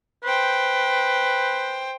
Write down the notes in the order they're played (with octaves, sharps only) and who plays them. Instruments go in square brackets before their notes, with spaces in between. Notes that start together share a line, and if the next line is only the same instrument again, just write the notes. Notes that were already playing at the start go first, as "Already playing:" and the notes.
[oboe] B4 [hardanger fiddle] C5 G5